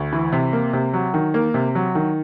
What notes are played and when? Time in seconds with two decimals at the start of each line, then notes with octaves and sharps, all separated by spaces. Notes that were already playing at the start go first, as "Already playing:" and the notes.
Already playing: D2
0.12 E3
0.32 C3
0.53 A#3
0.73 C3
0.93 F#3
1.14 D#3
1.34 A#3
1.54 C3
1.75 F#3
1.95 D#3